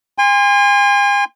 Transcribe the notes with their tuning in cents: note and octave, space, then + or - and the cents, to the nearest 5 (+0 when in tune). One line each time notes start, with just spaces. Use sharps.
G#5 -40 C6 -5